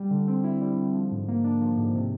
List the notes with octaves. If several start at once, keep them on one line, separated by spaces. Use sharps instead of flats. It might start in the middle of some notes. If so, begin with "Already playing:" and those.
Already playing: G3
D3
C4
E4
G3
D3
F3
G#2
A#3
D4
F3
G#2
C3